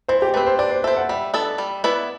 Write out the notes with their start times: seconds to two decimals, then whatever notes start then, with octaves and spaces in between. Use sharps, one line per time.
0.08 E3 C5
0.22 G4
0.34 A3 C4 B4
0.47 C5
0.59 D4 D5
0.71 C5
0.84 A4 C5 E5
0.97 F#5
1.09 G3 E5
1.34 B3 D4 A4
1.58 G3
1.84 B3 E4 B4 D5